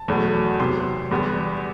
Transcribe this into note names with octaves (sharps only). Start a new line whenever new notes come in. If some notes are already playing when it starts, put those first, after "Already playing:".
Already playing: A5
E2 B2 F#3 A3
C3 F#3 B3 C6
E2 D3 G3 B3